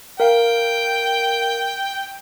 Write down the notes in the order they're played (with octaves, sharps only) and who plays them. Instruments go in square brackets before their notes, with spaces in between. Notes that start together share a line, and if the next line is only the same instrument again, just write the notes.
[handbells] A#4 F5 [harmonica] G5